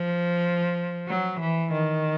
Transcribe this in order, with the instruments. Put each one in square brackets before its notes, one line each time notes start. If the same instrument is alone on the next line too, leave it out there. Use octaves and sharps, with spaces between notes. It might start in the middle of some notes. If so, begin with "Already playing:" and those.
Already playing: [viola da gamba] F3
F#3
E3
D#3